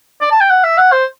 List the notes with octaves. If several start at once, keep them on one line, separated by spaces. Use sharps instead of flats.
D5
A5
G5
F#5
E5
F#5
C5